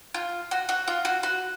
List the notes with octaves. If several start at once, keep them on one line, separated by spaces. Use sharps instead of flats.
F4
F#4
F#4
F4
F#4
F#4